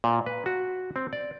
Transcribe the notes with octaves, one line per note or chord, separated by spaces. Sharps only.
A#2
B4
F#4
C4
D5